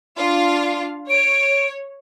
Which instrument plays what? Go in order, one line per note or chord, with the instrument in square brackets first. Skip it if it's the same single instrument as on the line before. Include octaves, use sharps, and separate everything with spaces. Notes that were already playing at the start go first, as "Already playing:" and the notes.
[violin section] D4 F4 F5
[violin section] C#5 [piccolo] D7